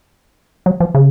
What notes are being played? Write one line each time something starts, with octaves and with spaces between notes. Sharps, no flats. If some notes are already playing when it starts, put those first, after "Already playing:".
F#3
F3
C#3